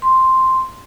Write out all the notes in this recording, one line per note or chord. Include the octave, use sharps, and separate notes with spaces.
C6